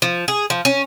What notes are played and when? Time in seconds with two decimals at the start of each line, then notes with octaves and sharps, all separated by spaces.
0.02 F3
0.28 G#4
0.50 F3
0.65 C#4